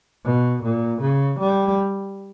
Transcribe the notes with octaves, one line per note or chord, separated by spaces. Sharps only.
B2
A#2
C#3
G3